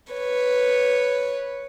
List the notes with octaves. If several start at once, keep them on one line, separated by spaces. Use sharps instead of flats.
B4 C#5